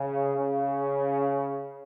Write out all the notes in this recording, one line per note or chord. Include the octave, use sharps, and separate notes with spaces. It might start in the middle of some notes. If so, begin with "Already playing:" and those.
Already playing: C#3
C#3